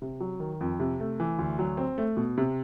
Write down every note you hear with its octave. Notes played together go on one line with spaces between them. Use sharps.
C3
F#3
D#3
F2
C3
A3
E3
D2
F#3
C4
A3
B2
C3